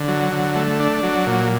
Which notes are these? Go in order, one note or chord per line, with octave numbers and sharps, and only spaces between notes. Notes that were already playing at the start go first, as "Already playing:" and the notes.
Already playing: D3
F#3
D3
A3
D4
F#3
A#2